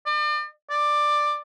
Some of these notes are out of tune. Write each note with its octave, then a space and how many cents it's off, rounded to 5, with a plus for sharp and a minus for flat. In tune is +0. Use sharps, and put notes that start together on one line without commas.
D5 +40
D5 +10